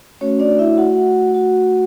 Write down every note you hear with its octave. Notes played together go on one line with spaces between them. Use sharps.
A3 C#4 F#4 C#5
D4 D5
E4 E5
F#4 F#5
F#4 F#5